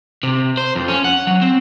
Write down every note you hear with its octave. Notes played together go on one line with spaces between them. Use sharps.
C3
C5
F2
C#4
F#5
F#3
C4